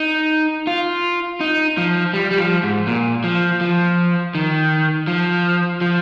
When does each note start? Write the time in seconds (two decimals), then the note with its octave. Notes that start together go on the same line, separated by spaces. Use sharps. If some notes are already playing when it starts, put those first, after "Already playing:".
Already playing: D#4
0.67 F4
1.40 D#4
1.77 F3
2.13 G3
2.31 G3
2.38 F3
2.63 G#2
2.87 A#2
3.24 F3
3.61 F3
4.35 D#3
5.07 F3
5.81 F3